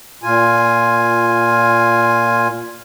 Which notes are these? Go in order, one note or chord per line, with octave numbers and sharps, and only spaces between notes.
A#2 F4 G#5